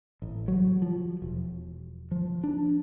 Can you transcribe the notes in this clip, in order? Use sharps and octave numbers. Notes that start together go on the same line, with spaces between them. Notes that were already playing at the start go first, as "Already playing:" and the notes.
A1
F#3
F3
E1
F3
D4